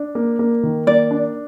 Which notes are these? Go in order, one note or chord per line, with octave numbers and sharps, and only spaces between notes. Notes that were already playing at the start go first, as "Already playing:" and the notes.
Already playing: D4
A#3
A#3
D#3
A#3 D5
D4